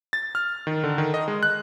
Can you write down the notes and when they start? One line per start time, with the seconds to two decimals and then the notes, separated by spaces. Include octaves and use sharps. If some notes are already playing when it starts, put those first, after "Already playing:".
0.13 A6
0.35 F6
0.67 D#3
0.84 D3
0.98 D#3
1.14 D#5
1.28 G#3
1.43 F#6